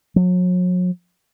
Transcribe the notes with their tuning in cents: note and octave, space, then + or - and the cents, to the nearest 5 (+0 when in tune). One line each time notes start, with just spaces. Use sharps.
F#3 -40